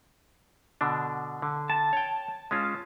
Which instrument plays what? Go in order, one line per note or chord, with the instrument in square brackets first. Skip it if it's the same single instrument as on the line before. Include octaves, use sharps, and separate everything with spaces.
[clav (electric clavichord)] B2 D3 D4
D3
[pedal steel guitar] A5
[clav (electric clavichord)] C#5 G5
G#3 C#4 F4